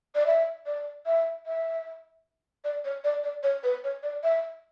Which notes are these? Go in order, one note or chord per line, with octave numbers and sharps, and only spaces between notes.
D5
E5
D5
E5
E5
D5
C#5
D5
D5
C#5
B4
C#5
D5
E5